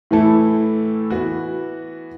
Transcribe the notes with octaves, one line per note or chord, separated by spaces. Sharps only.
A2 E3 A3 E4 A4
E3 B3 F#4